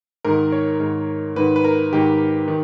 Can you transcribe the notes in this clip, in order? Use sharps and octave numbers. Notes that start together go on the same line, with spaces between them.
G#2 D#3 A#4
C#5
G#2 D#3
G#2 D#3 B4
B4
A#4
G#2 D#3 G4
D#3